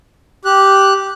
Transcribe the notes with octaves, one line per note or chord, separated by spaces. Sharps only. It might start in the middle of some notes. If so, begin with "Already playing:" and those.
G4 F#6